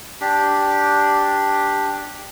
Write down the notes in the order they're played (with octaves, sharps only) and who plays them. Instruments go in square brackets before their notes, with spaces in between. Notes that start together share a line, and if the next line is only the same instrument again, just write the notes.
[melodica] D4 G4